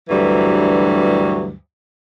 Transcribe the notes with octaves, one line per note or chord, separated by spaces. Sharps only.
D2 G2 E3 F#3 G3